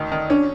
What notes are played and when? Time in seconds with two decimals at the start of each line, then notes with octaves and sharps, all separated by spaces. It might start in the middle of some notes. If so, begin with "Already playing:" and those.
Already playing: D2 D#3
0.12 D#3
0.30 C#4 D4